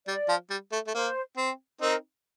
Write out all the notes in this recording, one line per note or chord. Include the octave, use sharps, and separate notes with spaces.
G3 D5
F3
G3
A3
A3
A#3 C5
C4
C4 D#4 A#4